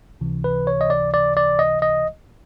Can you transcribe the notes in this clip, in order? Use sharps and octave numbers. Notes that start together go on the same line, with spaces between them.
C#2 C3 E3
B4
C#5
D#5
D5
D5
D5
D#5
D#5